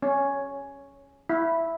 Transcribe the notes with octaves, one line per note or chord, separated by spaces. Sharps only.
C#4
E4